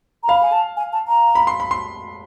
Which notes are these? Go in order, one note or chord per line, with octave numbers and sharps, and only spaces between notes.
A#5
F5 B5
G#5
A5
G#5
A5
A#5
B5
C6
B5
C6